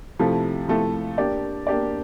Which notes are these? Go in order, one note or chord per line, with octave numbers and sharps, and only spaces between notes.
C3 F3 A3 E4 A4
C3 F3 A3 E4 A4
A#3 D4 G4 D5
A#3 D4 G4 D5